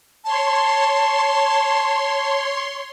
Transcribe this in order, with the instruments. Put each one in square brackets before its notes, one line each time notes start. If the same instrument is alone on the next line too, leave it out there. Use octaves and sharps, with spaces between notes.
[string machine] C#5 C6 [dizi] A5